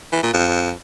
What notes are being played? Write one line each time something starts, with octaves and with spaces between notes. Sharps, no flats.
E3
A#2
F2